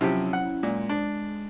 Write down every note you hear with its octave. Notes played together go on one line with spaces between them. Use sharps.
C3 F3 F#3 C#4 E4 G4
F#5
A#2 G#3
D4